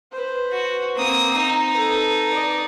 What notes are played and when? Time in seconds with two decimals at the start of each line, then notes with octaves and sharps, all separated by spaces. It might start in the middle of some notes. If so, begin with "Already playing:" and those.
0.12 B4 C5
0.52 F#4
0.95 A#3 C4 D#6
1.35 D#4
1.73 A4 B4
2.31 D5 D#5